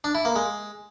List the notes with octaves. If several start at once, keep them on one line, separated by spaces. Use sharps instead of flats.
D4
E4
A#3
G#3